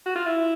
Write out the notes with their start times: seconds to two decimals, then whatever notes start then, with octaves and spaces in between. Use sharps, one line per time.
0.06 F#4
0.16 F4
0.26 E4